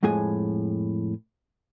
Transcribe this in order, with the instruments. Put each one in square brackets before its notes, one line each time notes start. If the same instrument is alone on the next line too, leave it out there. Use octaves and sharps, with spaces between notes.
[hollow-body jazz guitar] F2 A2 G#3 G#4 G#5